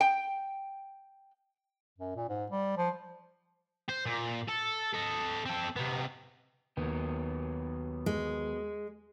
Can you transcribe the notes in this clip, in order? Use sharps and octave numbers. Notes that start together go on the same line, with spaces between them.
G5
F#2
A#2
G#2
G3
F3
C5
A#2
A4
A4 D#5
C4 A4
C3 B3
D#2 F#3 B3 G4
G#3